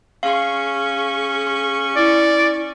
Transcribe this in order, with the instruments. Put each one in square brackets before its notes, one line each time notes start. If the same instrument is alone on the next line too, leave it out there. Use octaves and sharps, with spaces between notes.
[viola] C#4 C#6 [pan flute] G#4 [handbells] F5
[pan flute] E4 [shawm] D5